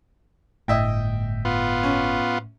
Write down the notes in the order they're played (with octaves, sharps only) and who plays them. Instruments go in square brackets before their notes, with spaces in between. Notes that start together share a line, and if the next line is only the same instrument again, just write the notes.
[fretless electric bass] G1 [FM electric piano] A2 [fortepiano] D#5 E5 G5
[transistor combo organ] B3 F4
[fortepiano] C#4